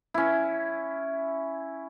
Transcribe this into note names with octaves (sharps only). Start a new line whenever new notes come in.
C#4 E4